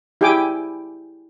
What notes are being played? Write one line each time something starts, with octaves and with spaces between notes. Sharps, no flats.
E4 G4 G#4 G5 G#5 D6